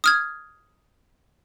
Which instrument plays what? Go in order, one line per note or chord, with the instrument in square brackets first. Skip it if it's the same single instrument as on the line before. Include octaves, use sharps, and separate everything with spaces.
[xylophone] D#6 F6 G#6